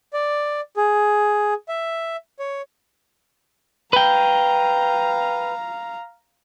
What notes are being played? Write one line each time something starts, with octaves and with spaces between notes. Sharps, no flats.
D5
G#4
E5
C#5
B4 F5 G5 A#5